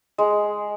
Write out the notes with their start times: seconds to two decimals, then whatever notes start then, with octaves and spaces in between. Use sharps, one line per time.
0.18 G#3